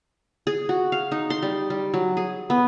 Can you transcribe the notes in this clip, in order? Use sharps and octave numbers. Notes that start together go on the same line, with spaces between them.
G#4
F#4
F5
D#4
C6
G3
G3
F#3
G#4
B3